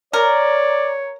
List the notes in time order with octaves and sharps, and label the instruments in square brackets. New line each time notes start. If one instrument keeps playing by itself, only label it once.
[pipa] A#4 [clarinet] C#5 [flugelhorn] D5